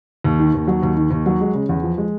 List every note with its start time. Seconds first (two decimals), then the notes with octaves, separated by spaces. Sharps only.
0.24 D#2
0.40 D#3
0.54 D#2
0.68 F#3
0.83 D#2
0.97 D#3
1.11 D#2
1.26 F#3
1.41 G#3
1.55 C#3
1.69 E2
1.83 F3
1.98 G#3